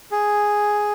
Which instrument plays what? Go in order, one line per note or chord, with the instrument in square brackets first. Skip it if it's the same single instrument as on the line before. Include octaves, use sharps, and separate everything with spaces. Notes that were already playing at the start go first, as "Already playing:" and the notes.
[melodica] G#4